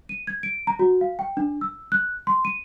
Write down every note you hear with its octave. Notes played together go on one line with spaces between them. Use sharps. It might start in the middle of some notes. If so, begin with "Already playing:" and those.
D#7
G#6
D7
A#5
F#4
F5
G5
D4
E6
F#6
C6
D#7